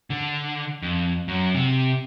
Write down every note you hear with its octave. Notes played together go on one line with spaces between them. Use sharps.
D3
F2
F#2
C3